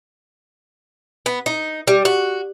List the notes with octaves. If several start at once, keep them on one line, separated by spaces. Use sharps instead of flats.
B3
D#4
G3
F#4